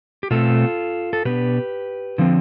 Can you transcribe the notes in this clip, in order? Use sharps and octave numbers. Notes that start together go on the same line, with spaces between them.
G4
B2 A3 C4 F4 A4
A4
B2 B3 D4 G4 B4
D3 F3 C4